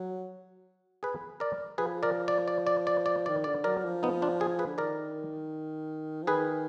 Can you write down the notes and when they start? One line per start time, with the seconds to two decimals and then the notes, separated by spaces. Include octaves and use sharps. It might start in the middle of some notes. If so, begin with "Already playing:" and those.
Already playing: F#3
1.03 G#4 B4
1.40 A#4 D5
1.78 F3 G#4 B4
2.03 A#4 D5
2.28 D5
2.48 D5
2.67 D5
2.87 D5
3.06 D5
3.26 D#3 D5
3.44 D3 D5
3.64 F#3 A#4 D5
3.84 F3
4.03 B3 D#4
4.22 D4 F4
4.40 F4 G#4
4.59 G#4 B4
4.66 D3
4.77 D#3 A#4 D5
6.23 F3
6.27 D#3 G#4 B4